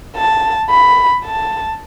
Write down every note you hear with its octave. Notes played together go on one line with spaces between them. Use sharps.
A5
B5
A5